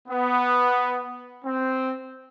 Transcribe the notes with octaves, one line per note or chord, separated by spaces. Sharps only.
B3
C4